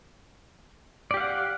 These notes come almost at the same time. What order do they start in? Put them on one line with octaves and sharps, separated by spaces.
D5 G4 F5 F#5